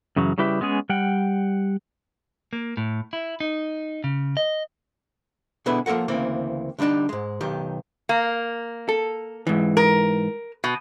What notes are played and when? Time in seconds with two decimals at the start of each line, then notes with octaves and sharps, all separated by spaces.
0.16 F#2 C#3 E3 F#3
0.38 C#3 G3 E4 G4 B4 E5
0.61 G#3 B3 C#4 G#4
0.89 G3 F#5 G5
2.53 A#3
2.77 A2
3.13 E4
3.40 D#4
4.04 C#3
4.37 D#5
5.66 B2 D3 B3 E4 G#4 B4
5.86 F3 A#3 A4 A#4 F#5
6.08 D2 C#3 E3 A#3 C4
6.79 D3 G3 C4 D4 D#4
7.09 G#2 G#3
7.41 B1 D#3 G4
8.09 A#3
8.89 A4
9.47 G#2 E3
9.77 A#4
10.64 B2